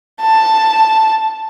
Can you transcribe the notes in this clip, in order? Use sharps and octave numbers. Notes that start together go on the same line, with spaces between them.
A5